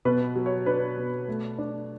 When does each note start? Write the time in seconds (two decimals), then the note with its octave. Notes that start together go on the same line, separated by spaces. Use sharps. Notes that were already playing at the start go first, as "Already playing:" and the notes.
0.05 B2 B4
0.36 F#3
0.46 C#5
0.66 D4 B4
0.98 B2
1.28 A3
1.58 D4